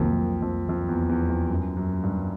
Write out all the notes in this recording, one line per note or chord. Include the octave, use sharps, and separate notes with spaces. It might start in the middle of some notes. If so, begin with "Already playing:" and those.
Already playing: C2 F2 C3 D#3 F#3 A#3
F2
F2
E2
E2
F2
F#2
F#2
G2